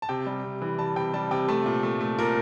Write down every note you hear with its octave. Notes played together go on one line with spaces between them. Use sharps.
A5
C3 G5
G3
C3
E3
G3 A5
C3 G5
G3 A5
C3 G5
A3 A5
A#2
A3
A3
A#2 A#4